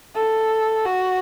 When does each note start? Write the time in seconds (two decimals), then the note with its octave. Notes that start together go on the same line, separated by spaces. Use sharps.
0.16 A4
0.85 F#4